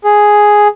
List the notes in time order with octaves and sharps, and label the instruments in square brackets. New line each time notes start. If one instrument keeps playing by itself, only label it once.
[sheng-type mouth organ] G#4